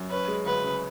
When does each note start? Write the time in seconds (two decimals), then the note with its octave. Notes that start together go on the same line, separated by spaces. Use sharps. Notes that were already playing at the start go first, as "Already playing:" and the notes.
Already playing: F#2
0.10 C#4 B4
0.28 G#3
0.45 D2 B4
0.64 C#3